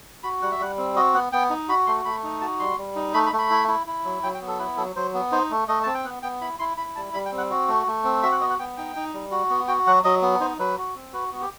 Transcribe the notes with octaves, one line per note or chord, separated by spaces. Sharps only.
F#4 B5
G3 F#5
E5
G3 F#5
C4
F#4 D#5
B3 F#5
B3 G5
D#4
F#4 B5
A3 C6
A3 B5
D#4
F#4 A5
G3 C6
G3
D#4
A3 B5
B5
A3
B5
E4
E4
E4
F#3
F#3 G5
G5
B3
A4
E4 B4
F#3 A4
F#3 C5
B3
D#4 C5
A3
A3 D#5
C4 A5
G5
B3 F#5
B3 G5
E4 B5
E4 C6
E4 B5
G3 A5
G3 B5
G5
C4
F#5
F#4
A3
A3
C4
F#4 E5
F#5
B3 D#5
F#5
B3 G5
D#4 G5
D#4
G3
F#4
B3
F#4 G5
F#3 F#5
F#3 D#5
B3
D#4 C5
F#3 B4
F#4
C4
F#4 B4
B3 F#4
G4